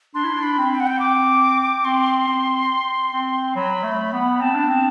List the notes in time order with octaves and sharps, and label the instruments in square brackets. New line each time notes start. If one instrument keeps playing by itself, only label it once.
[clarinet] D4 [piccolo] C6
[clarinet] E4
D4
[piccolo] B5
[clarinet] C4
[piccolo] G5
F#5
G5
D6
[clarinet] C4 [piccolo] C6
[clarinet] C4
C4
[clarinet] F#3 [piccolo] B5
[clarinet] A3
B3
[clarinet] C4 [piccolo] A5
[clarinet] D4
C4